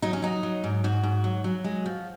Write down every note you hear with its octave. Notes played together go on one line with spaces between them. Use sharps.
F#3 D#4
C#4
F#3 D#4
F#3
G#2
G#2 F#4
G#2
F#3
F#3
G#3
F3